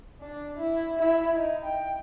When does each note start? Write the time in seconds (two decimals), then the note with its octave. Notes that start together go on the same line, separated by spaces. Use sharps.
0.21 D4
0.57 E4
0.98 E4
1.34 D#4
1.64 G5